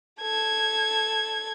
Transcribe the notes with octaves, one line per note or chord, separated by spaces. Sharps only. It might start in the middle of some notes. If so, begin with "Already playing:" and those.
A4 G#6